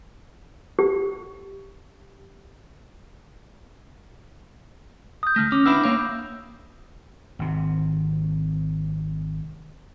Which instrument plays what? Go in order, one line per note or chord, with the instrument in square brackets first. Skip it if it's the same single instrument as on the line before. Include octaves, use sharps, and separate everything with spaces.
[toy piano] G4
[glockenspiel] D#6 G6
[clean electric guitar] D2 A3 [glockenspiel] F6 A#6
[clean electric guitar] C#4 [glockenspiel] D6
[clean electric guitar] B3 D4 E4 [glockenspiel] E6
[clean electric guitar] A#3 C#5 F5
[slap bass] G#1 C3